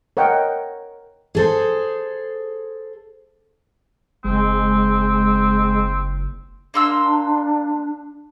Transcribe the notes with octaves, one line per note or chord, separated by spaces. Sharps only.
A#4 C#5 D#5 F#5 G5
G#4 A4 C5
F#1 G#3 C4
A#3 D4 C6 E6